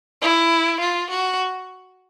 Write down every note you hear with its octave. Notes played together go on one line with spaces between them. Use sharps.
E4
F4
F#4